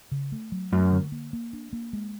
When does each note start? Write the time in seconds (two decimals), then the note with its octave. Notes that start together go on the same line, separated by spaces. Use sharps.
0.12 C#3
0.32 A3
0.52 F#3
0.72 F#2 A3
0.92 D3
1.12 A#3
1.33 A#3
1.53 D4
1.73 A#3
1.93 G#3